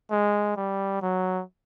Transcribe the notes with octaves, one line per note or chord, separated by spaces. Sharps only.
G#3
G3
F#3